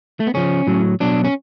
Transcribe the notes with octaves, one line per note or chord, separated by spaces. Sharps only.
A3
B3
C#3 F3 C#4
A2 F#3
B2 F#3 D4
C#4